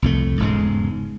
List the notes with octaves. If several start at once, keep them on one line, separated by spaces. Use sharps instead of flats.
C2 F2 A3
E1 G#2 C#3 G#3